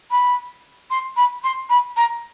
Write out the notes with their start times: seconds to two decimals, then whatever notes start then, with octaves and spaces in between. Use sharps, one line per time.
0.11 B5
0.90 C6
1.17 B5
1.44 C6
1.70 B5
1.97 A#5